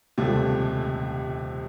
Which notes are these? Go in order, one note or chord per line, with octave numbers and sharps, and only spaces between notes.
D#1 C#2 C3 G3 A3